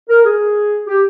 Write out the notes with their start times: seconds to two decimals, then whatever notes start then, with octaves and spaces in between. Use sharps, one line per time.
0.10 A#4
0.26 G#4
0.87 G4